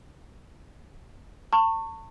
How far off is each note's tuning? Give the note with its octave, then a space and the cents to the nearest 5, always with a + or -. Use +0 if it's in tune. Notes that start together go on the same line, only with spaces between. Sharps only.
A5 +35 C#6 -15